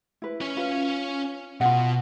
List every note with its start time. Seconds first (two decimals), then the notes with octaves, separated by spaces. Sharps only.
0.22 E4 B4
0.41 C#4 C#5
0.57 F4 B4
1.61 B2 F4 F#5